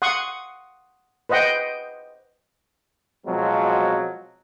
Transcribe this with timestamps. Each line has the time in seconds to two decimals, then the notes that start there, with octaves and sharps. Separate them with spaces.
0.02 F#5 C6 C#6 D#6
1.29 B4 C5 D#5 F#5 G5
3.27 B2 F3 F#3 G#3 C4